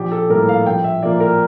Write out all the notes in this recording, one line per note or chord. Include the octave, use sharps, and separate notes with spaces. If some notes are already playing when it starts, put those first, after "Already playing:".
Already playing: A#1 G4
A4
A2 G3 A#3 A#4
F5
A#1 G5
E5
A#2 F3 A#3 D5
A#4